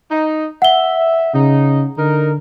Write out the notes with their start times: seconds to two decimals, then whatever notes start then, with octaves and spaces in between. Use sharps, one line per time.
0.11 D#4
0.62 E5 F#5 G7
1.34 C#3 D#4
1.98 D3 D#4 A#4